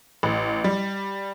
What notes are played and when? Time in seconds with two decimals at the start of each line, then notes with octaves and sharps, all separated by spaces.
0.23 A1
0.64 G3